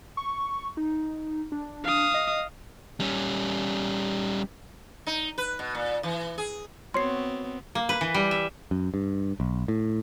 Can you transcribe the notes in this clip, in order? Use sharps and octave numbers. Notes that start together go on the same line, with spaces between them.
C#6
D#4
D4
F5 D#6
D#5
G3 C#4
D#4
B4
B2
A#2
E3
G#4
B3 C4 F#4 C#5 C6 C7
A#3
B4
E3
G3
E5
F#2
G2
B1
A2